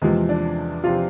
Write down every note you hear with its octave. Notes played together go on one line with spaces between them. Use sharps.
E2 C3 F3 G#3
D4
C3 F3 F4